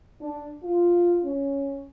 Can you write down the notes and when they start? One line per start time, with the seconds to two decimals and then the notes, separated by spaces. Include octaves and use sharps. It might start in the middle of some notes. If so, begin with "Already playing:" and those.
0.20 D4
0.63 F4
1.24 C#4